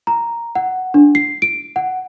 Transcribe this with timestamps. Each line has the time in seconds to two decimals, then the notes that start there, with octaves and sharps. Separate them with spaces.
0.07 A#5
0.55 F#5
0.94 D4
1.15 C7
1.42 D7
1.76 F#5